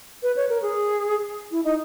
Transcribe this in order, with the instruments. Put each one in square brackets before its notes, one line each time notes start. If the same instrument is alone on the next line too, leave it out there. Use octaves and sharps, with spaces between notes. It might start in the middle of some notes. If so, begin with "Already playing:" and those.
[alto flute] B4
C#5
A#4
G#4
E4
D#4